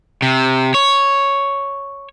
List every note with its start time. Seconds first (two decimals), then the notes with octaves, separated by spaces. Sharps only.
0.22 C3
0.74 C#5